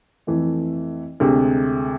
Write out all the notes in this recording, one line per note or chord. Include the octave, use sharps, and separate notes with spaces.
F2 E3 A3
D2 C3 G#3